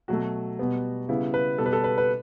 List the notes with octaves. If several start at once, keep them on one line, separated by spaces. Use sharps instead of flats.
B2 F#3 A3 F#4
B2 G3 B3
C#3 G3 B3 E4
B4
B2 G3 B3 A4
B4
A4
B4
B4